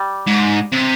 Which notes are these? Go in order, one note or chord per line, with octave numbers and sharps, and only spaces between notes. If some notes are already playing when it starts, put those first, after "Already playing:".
Already playing: G3
G#2
C3